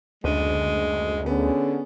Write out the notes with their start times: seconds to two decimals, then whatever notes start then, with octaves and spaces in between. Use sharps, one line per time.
0.24 F#1 D2 G#3 D4
1.26 D3 B3 C#4 G#4